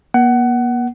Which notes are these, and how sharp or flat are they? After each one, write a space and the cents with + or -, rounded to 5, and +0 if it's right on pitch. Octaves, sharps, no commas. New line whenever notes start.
A#3 +45 F#5 +20